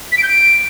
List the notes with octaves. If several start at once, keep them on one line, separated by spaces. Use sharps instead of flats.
B6
D7
G6
D7